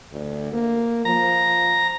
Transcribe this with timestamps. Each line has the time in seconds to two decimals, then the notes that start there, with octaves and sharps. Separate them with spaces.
0.12 D2
0.53 A#3
1.05 F3 A#5